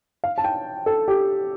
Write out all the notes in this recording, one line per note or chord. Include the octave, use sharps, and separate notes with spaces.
F5
A5
G5
A4
G4